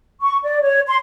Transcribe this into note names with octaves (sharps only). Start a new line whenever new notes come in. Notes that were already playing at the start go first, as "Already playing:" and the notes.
C#6
D5
C#5
C6